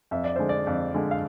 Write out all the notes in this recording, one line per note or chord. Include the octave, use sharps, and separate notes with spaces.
F2 E5
D5
D3 G#3 C5
D5
F2
D3 G#3
F5